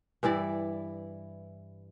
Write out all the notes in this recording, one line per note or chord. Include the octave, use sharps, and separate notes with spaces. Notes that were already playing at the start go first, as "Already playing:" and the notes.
G2 E3 E4 D5